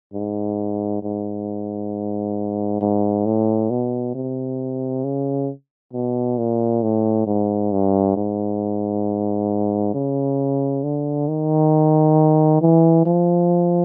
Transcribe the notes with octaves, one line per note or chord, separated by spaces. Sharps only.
G#2
G#2
G#2
A2
B2
C3
C#3
B2
A#2
A2
G#2
G2
G#2
C#3
D3
D#3
E3
F3